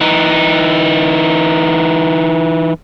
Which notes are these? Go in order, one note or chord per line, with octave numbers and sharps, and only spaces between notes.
E3 D#4